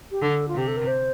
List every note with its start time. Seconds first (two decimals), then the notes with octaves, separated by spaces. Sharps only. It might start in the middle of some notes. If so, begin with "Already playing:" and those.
0.11 G4
0.22 D3 A4
0.48 F4
0.55 C3 G4
0.68 A4
0.77 A#4
0.87 C5